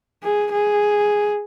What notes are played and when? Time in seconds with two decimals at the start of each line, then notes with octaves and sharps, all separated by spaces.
0.24 G#4
0.52 G#4